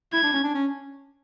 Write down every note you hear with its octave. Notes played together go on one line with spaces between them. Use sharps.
E4 G#6
D4
C#4
D4
C#4